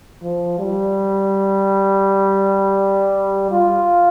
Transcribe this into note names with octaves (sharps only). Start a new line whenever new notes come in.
F3
G3
F4